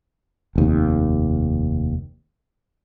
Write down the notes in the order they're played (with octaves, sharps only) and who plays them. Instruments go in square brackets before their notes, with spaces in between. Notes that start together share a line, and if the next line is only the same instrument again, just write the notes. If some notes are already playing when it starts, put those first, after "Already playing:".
[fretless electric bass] F1 D#2